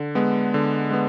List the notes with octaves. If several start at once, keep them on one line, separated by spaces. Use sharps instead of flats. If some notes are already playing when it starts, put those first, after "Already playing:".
Already playing: D3
G#3 B3
D3
G#3 B3